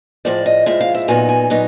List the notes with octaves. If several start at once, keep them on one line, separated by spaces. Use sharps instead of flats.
A2 F3 G#3 D5
D#5
A2 F3 G#3 E5
F5
E5
A#2 F#3 B3 D#4 G#5
G#5
A#2 F#3 B3 D#4